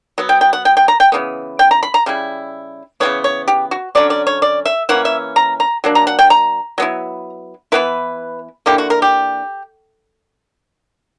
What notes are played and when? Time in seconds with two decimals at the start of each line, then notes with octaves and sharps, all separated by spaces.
0.18 F#3 B3
0.29 G5
0.41 G5
0.53 F#5
0.65 G5
0.77 G5
0.88 A#5
1.00 G5
1.12 C#3 E3 B3
1.59 G5
1.71 A#5
1.83 B5
1.94 A#5
2.06 C#3 G3 E4
3.00 C#3 E3 G3 B3 C#5
3.24 C#5
3.48 G4
3.71 F#4
3.95 D3 F#3 C#4 D5
4.10 D5
4.27 C#5
4.42 D5
4.65 E5
4.89 E3 A#3 C#4 F#5
5.05 E5
5.36 A#5
5.60 A#5
5.84 F#3 A#3 D4
5.95 A#5
6.07 F#5
6.19 G5
6.30 A#5
6.78 F#3 B3 E4
7.72 E3 B3 E4 B4
8.66 D3 A#3 E4 G4
8.78 F#4
8.90 A#4
9.02 G4